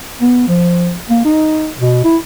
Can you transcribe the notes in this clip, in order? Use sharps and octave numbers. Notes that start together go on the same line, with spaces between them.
B3
F3
A#3
D#4
B2
E4